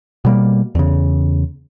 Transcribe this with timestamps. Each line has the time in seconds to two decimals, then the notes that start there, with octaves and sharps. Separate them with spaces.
0.25 B2 G3 A#3
0.75 E2 C#3